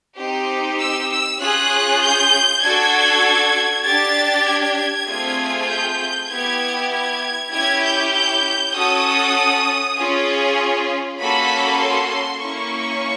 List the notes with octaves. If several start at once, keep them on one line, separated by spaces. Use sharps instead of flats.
C4 D#4 G4
E6
E6
C#4 F4 G#4 F#6
G6
D4 F#4 A4 G#6
D4 G4 A6
G#6
A3 C4 F4 G#4
G6
B3 E4 G4 G#6
G#6
C#4 E4 G4 G#6
G6
G6
C#4 F#4 A4 D#6
C#4 F4 G#4
A#3 C#4 F#4 A4 B5
C6
A#3 C#4 E4 C#6